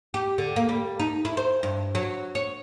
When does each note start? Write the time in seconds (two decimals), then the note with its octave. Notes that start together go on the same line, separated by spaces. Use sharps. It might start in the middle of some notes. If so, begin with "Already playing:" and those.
0.14 G4
0.38 D3
0.56 A#3
0.69 G3
0.99 D#4
1.25 E4
1.37 C5
1.63 G2
1.95 F#3
2.35 C#5